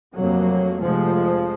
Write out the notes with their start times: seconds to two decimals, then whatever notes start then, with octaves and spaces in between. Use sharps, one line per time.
0.14 F1 F2 F#3 A#3
0.81 F1 F2 F3 G#3